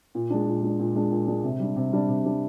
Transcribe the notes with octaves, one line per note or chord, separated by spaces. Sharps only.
A#2
G#3 D4
A#2
G#3 D4
A#2
G#3 D4
A#2
G#3 D4
C3
G3 D4
C3
G3 D4
C3
G3 D4